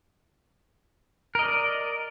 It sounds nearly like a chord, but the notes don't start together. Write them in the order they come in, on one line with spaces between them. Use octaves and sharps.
A#4 D#5 D5